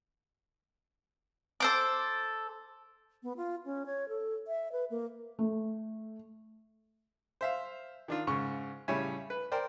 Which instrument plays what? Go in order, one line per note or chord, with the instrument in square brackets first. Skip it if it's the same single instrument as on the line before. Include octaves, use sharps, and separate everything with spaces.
[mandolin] A4 C5 D6
[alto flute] B3
F4
C#4
C#5
A4
E5
B4
A#3
[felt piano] A3
[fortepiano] C5 E5 F5
D#3 D4 F4
G#2 C#3 C#6
A2 C#3 G3 C#5 E5 G#5
B4
A#4 C5 D5 G5